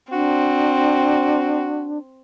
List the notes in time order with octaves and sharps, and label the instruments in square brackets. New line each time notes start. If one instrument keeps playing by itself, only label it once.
[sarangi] C4 [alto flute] D4 [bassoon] F#4